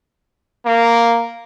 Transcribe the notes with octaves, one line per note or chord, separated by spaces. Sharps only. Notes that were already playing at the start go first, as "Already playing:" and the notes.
A#3